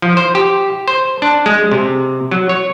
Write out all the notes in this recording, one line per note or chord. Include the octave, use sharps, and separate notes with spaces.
F3
C5
G4
C5
D4
G#3
C3
F#3
C#5